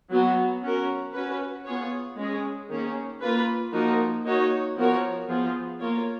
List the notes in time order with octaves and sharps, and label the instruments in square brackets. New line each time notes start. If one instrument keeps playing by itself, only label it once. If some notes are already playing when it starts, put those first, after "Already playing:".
[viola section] F#3 B3 F#4
C#4 F#4 A#4
C#4 F#4 B4
B3 F4 G#4 C#5
G#3 C#4 G#4
D#3 A#3 C#4 G#4
A#3 F4 B4
F3 A#3 D#4 F#4 A#4
A#3 D#4 F#4 C#5
F3 B3 F#4 A#4 C#5
F3 B3 F4 G#4
A#3 F4 A#4 C#5